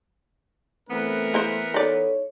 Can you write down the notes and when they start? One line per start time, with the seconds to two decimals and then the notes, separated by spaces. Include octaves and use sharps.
0.90 E3 A3 B3 C4 A#4
1.34 A#3 E4 C5
1.74 D#4 A4 C#5 D5